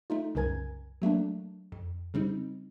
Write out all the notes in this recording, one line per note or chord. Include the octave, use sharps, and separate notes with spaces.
A3 D#4 F4
C2 F#2 C#3 A#4 G#5 G#6
F#3 A3 A#3 D4
F2
C#3 G3 C4 D#4